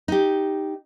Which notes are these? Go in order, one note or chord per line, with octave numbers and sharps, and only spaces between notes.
D#4 G4